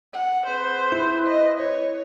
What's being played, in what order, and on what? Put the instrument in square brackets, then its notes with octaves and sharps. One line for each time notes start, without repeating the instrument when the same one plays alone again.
[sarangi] F#5
[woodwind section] C4 G#4 B4 [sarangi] C5
[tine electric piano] E4
[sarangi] D#5
C#5